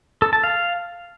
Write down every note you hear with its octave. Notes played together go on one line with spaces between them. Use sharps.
A4
A5
F5